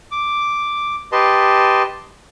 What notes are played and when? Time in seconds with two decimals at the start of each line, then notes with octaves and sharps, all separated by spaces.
0.11 D6
1.12 G4 B4 D#5 A5 C6